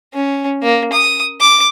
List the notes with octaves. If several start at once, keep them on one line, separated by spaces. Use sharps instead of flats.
C#4
A#3
D#6
D6